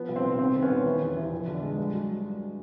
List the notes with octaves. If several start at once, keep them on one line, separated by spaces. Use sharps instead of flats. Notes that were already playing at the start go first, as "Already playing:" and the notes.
Already playing: F3 B3
C2
C4
C2
D#3 C4
D#3
B3 C#4
D#2
E3
E2
E3
F2
D3
G#3
G2
F#3